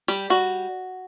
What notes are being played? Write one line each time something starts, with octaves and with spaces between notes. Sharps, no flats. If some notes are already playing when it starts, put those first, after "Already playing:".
G3 G4
G3 F#4